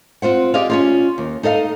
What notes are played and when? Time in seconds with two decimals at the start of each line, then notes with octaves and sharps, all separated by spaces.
0.22 C4 F4 C5 F#5
0.54 G4 G#4 D5 D#5 F5
0.70 C#4 D#4 F4
1.18 D#2
1.43 D#4 A4 D#5 F5